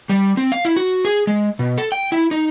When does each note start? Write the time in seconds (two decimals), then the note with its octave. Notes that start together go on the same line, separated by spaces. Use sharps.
0.09 G3
0.37 C4
0.52 F5
0.65 E4
0.76 F#4
1.05 G#4
1.27 G#3
1.59 B2
1.78 A4
1.92 G5
2.12 E4
2.31 D#4